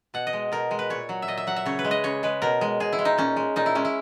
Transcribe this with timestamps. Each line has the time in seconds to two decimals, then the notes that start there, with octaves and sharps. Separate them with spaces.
0.14 B2 F#5
0.27 D#5
0.33 G#3
0.52 B2 A#4
0.71 G#3
0.79 B4
0.90 A#2 C#5
1.09 F#3
1.22 E5
1.28 A#2 D#5
1.38 E5
1.47 F#3 F#5
1.56 E5
1.66 C#3 C#5
1.79 B4
1.85 G#3
1.91 D#5
2.04 C#3 C#5
2.23 G#3 B4
2.42 B2 A#4
2.61 G#3
2.80 B2 G#4
2.93 E4
2.99 G#3
3.05 D#4
3.18 A#2 C#4
3.36 G#3
3.56 A#2 D#4
3.66 E4
3.75 G#3 C#4
3.85 E4